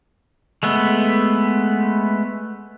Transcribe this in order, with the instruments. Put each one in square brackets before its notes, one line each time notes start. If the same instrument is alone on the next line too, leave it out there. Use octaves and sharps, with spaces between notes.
[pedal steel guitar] G#3 A3 B3